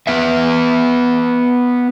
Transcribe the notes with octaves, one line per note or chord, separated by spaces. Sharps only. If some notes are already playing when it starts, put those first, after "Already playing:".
B3 B4 E5